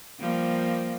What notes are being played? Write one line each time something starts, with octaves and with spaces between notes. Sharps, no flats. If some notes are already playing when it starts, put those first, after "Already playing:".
F3 G3 A#3